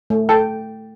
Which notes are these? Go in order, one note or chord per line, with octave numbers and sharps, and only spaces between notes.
A3
A4 G5